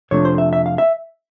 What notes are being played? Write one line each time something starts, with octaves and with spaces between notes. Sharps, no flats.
F2 C3 F3 A3 D4 C#5
C5
E5
E5
F5
E5